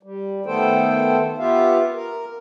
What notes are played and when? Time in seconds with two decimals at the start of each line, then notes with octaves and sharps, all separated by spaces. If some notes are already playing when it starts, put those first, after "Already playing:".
0.03 G3
0.46 D#3 A3 B3 A4 C5 G5
1.38 B3 F4 G4 E5 F5
1.94 A#4